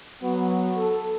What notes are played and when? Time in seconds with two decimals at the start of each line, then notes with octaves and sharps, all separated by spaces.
0.23 F#3 B3 F#4
0.77 A4